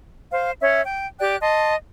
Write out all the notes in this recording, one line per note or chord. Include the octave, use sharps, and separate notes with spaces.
C5 F5
C#4 C#5 E5
G5
G4 D5 G5 F#6
D#5 A5 C6